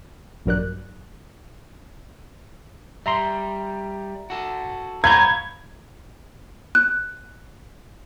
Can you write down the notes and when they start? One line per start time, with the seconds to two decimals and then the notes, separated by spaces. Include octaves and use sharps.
0.46 A#1 G2 F#3 A#4 D5 F#6
3.06 G3 E5 A#5 C6
4.30 F#4 A4
5.04 G2 B3 C#5 F5 A#5 B5 G6 G#6
6.75 F#6